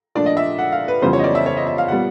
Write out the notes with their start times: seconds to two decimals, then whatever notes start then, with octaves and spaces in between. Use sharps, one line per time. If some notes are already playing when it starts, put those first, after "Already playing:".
0.15 A#2 F3 A3 D4 D5
0.26 D#5
0.37 E5
0.59 F#5
0.72 F5
0.88 B4
1.02 F2 C#3 E3 G3 B3 C5
1.13 C#5
1.19 D#5
1.24 D5
1.35 E5
1.46 C#5
1.57 D#5
1.67 E5
1.78 F5
1.88 A#2 G3 B3 F#5